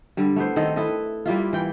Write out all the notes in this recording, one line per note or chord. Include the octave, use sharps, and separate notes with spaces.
D3 G3
A3 B3 E4 C5
D#3 C4 A4 D#5
E4 A4 B4 D#5
G3 A#3 E4 F4
E3 G5